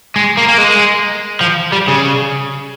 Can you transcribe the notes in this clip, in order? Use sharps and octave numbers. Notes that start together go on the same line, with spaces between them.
G#3
A#3
A#3
G#3
F3
G3
C#3